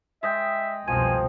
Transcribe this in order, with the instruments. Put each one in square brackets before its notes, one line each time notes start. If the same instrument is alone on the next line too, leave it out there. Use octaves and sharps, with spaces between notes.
[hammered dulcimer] G#3 D#5 G5 [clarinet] E5
[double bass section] C2 F2 B2 [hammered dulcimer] F3 C4 [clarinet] G#5